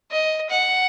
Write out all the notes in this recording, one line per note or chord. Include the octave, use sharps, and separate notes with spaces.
D#5
F#5